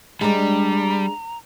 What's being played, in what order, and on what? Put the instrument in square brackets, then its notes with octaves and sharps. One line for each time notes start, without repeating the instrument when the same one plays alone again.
[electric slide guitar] G3 [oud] G#3 D4 [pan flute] A#5